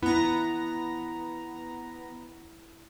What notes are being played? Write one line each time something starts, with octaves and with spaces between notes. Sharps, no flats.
B3 E4 A#5